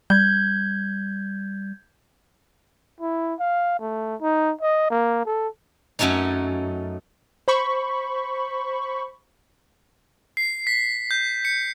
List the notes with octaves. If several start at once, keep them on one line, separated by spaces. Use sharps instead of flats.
G3 G6 G#6
E4
F5
A3
D#4
D#5
A#3
A4
F#2 F#3 A3 C#4 D#4
C5 B5 C#6
C7
B6
G6
C#7